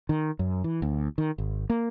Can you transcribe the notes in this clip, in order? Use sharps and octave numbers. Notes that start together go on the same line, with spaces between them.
D#3
F#2
E3
D2
D#3
G#1
A#3